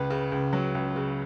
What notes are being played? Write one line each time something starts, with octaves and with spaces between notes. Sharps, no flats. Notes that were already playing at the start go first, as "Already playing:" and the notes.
Already playing: C#2 B4
C#3
C#2
F#3
C#2
C#3